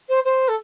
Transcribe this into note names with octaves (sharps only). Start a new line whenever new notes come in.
C5
C5
A4